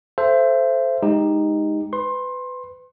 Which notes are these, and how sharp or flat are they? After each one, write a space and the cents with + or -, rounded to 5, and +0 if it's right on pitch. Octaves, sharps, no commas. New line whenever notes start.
A4 +0 C5 +0 E5 +35
G#3 +0 D#4 +0 G4 +15
B4 +25 C6 +25